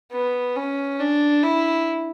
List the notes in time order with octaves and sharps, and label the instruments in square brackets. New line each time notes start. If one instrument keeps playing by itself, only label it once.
[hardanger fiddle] B3
C#4
D4
E4